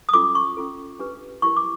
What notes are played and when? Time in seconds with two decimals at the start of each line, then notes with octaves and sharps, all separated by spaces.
0.09 D#6
0.13 C#4 F4 A4 D6
0.35 C#6
0.57 C#4 F4 A4
0.99 D4 G4 B4
1.42 E4 G4 A#4 C#6
1.57 D6